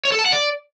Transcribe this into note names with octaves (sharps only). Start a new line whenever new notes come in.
C#5
A4
A5
F#5
D5